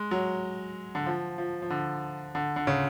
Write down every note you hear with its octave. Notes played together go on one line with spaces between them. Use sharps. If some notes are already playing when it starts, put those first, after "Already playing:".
Already playing: G#3
F#3
D3
F3
F3
F3
D3
D3
D3
C#3